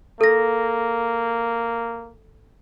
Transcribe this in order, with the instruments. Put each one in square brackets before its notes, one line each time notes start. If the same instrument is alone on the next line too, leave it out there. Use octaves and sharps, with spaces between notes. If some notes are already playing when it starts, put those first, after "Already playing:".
[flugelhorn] A#3 [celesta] A4 A#6